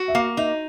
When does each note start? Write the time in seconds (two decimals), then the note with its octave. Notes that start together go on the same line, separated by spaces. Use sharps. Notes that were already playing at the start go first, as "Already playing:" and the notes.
Already playing: F#4
0.08 E5
0.15 A#3 F5
0.37 D#4 E5